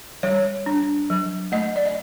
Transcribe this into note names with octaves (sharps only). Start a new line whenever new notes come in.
G3 C#5
D4
F#3
A3 D#5
D5
D#5